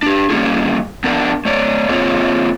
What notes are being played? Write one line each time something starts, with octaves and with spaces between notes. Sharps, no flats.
D4 G4
F#3 G3 A#3 C#4 F4 G#4
B3 D4 A#4
A3 C#5 D5
A#3 C4 F4 G#4 C#5